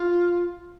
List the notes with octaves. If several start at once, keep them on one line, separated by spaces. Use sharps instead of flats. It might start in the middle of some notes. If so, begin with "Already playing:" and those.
Already playing: F4